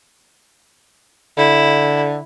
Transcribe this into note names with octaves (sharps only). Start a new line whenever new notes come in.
D3 E4